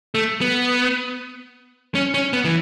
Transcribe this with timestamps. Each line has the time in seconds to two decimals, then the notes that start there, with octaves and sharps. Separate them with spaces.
0.15 A3
0.41 B3
1.95 C#4
2.14 C#4
2.33 B3
2.44 E3